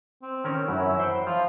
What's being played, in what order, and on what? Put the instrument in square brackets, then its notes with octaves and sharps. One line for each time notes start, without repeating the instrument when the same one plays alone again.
[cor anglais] C4
[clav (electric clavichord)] D#3 C#4 A#4
[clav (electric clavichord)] F#2 F#3 [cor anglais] E4
[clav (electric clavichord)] C5 F#5 G5
[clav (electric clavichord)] F3 [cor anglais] F4